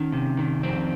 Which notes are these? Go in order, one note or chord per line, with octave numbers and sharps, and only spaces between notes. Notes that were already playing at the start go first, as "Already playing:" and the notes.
Already playing: D#3 C#4
C3
D#3
F2 C4